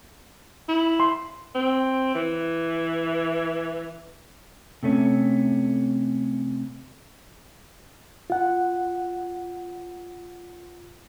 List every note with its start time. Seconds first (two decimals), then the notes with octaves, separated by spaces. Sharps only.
0.69 E4
1.00 C6
1.55 C4
2.15 E3
4.83 C3 A3 C#4
8.30 F4 F#5